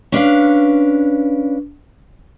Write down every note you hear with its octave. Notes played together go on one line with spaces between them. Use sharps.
C#4 D4 B4 F5